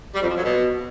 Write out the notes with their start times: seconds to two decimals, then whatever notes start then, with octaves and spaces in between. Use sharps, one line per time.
0.15 G3
0.22 F2
0.30 F3
0.37 F#3
0.45 B2